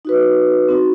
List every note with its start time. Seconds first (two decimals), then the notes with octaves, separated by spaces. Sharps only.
0.05 D#4 F#4 B4
0.69 C4 D#4 F#4